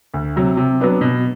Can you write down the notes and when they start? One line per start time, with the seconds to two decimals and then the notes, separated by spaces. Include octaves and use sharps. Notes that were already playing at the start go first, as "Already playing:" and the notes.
0.14 D2
0.36 C3 F#3
0.57 C3
0.80 F#3 B3 D4
1.01 B2